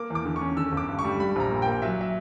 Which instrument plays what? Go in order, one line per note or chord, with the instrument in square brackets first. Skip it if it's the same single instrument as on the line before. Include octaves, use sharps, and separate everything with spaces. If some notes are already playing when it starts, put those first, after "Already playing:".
Already playing: [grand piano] A#3 D6
E2
D6
D3
C#6
C#4
D3 E6
G1
D6
G2
C#6
G3
G3 B5
A#1 A#5
A#2
A#3 G5
F#3 E5
E5